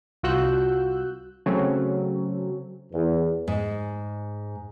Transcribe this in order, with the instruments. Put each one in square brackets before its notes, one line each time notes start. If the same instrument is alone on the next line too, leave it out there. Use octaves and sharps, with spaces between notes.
[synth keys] C2 F4 F#4 E6 F#6 G6
C#3 F#3 A3 C4 C#4
[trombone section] E2
[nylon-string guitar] G#2